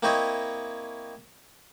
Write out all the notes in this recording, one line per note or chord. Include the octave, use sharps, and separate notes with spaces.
A#3 C4 E4 C5 C#5 D#5